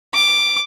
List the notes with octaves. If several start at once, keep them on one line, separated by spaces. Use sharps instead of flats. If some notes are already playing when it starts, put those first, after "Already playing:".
D6